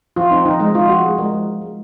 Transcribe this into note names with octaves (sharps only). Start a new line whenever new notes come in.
F3 F4
C4 D#4
F3 D#4
G#3 D#4
F3 F4
F3 F#4
G#3 G#4
G#3 A#4
F3
F3
G#3